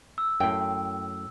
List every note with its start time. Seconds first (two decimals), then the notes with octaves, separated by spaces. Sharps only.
0.18 E6
0.40 F#2 A2 G5